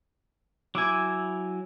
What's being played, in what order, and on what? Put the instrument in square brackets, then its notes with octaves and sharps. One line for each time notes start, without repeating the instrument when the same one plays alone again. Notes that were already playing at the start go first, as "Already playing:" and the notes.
[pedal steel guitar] F#3 E4 G#5 [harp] D6 E6 G#6